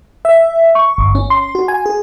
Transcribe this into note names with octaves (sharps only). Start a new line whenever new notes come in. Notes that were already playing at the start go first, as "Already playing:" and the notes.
E5
C#6
G1
C#4
C6
F#4
G#5
G#4